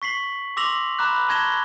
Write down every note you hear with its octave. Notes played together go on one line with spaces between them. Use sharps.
C#6 B6 C7 F#7
C6 D6 E6 A#6 F7 F#7
A#5 B5 D6 F#6
A5 C#6 G#6 A#6 E7 G7